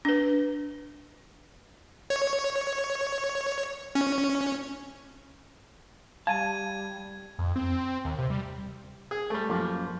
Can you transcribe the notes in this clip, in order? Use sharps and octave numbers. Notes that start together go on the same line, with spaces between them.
D4 B4
C#5
C#4
G3 F5 A5 G#6 D#7
F2
C4
D#2
C3
G3
G#4
G3 A3
F#2 F3 A#3